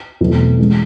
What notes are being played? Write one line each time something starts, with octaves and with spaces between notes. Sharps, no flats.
E2 B2 F#3 A3 C4
E3 G#3 C#4